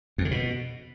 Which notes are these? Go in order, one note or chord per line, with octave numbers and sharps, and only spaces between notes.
F2
D3
B2